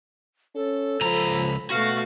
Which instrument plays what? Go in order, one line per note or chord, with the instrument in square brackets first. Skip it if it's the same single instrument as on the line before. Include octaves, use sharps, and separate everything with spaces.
[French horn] C#4 [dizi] A4
[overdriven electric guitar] C#2 A#5 [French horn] F3 [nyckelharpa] B5
[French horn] B2 [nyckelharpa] A3 F5 [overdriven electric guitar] F#4